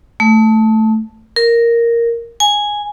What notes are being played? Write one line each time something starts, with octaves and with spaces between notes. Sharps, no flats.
A3
A#4
G#5